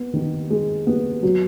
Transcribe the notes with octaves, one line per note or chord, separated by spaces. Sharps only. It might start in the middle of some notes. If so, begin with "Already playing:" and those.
Already playing: B3
D#3
G#3
B3
F#3